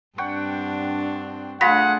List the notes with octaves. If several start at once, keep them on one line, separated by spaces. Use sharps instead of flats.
G2 C4 D4 F#5 G5 C#6
A3 D4 F4 G#4 F#5 B5 A#6 B6